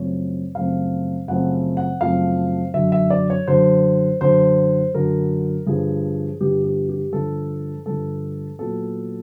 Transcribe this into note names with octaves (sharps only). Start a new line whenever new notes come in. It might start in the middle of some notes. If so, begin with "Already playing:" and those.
Already playing: F#2 C#3 F3 A3 C4 C#5
F#2 C#3 F3 A3 C4 F5
F#2 C#3 F3 A3 C4 F#5
F#5
F#2 C#3 F3 A3 C4 F5
F#2 D3 F#3 E5
E5
D5
C#5
F#2 D3 F#3 C5
F#2 D3 F#3 C5
F#2 D3 F#3 A#4
G2 D3 F3 G#4
G2 D3 F3 G4
G4
G4
G2 D3 F3 A4
G2 D3 F3 A4
A#2 F#3 B3 A4